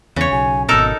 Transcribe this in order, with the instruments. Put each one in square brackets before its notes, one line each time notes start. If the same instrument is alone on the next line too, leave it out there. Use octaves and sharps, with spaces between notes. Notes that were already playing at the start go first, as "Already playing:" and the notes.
[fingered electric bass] E2 [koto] C#3 C#5
[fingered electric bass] B1 [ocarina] G#5
[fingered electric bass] G#1 B2 [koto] D#4 A4 A#4 [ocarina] E6